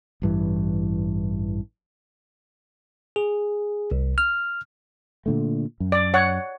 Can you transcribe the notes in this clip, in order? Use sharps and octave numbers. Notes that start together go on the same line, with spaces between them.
A1 G2 E3
G#4
C2
F6
A#2 D3 A3
F#2
D5
C#5 F#5